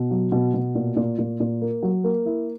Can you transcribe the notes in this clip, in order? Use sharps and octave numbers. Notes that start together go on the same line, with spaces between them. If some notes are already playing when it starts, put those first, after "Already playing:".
Already playing: B2
F#3
B2
B2
A#2
A#2
A#2
A#2
A#3
F#3
A#3
E4